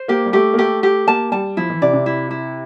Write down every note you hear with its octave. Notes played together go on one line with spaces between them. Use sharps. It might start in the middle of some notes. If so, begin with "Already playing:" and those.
Already playing: C5
A#3 G4
G3
A3 G4
A#3
A3 G4
G4
A#3 A5
G3 A5
F3 E4
E3
C3 D5
C3
E4
E4